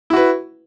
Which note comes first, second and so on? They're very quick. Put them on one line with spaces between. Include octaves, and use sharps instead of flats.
E4 F#4 B4